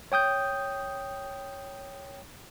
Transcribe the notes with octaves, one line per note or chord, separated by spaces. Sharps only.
C#5 G5 D#6 G6